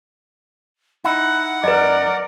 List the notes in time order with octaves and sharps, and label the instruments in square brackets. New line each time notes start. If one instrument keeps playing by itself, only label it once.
[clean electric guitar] D#4 E4 [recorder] F#5
[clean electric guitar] F#2 [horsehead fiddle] A#4 D5 [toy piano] B4 D#5